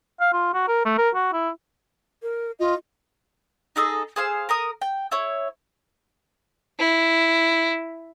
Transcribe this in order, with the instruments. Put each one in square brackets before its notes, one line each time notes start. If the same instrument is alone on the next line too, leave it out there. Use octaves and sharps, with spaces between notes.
[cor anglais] F5
F4
F#4
A#4
A3
A#4
F#4
E4
[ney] A#4
[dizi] F4 [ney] D#5
[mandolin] D#4 G#4 A4 D#5
G#4 C5 F5 E6
A#4 A#5 D#6
G5
E4 C#5
[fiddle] E4